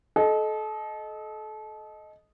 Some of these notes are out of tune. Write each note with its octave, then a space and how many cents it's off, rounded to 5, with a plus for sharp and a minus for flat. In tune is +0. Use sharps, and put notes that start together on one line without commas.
A4 -30 D#5 +0